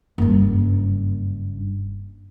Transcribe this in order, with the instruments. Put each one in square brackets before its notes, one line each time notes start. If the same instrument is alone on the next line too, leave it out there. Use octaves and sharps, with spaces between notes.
[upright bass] F#1 G2